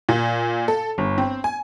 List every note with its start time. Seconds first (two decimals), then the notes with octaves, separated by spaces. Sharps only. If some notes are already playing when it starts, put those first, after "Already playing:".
0.09 A#2
0.68 A4
0.98 G1
1.18 C4
1.44 G#5